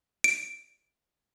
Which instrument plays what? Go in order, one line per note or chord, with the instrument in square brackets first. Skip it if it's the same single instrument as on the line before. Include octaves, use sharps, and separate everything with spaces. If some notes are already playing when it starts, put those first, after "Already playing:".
[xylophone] D7